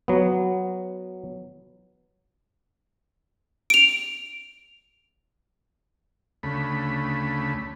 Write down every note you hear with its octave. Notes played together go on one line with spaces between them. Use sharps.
F#3 B3
D7 F7
D2 C#3 A3 B5